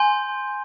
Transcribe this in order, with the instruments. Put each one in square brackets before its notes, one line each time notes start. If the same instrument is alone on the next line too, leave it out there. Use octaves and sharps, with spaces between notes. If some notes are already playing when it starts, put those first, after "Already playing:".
Already playing: [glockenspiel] G#5 C6 G6